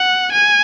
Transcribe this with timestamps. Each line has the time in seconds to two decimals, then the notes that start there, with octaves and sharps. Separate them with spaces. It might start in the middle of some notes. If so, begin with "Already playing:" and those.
Already playing: F#5
0.33 G#5